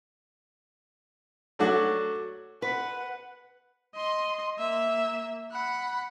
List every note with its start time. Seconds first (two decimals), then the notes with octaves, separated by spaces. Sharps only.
1.59 F#3 A3 D4 F#4
2.62 B4 F#5
3.95 D#5 C6
4.59 A#3 E5
5.52 F#5 B5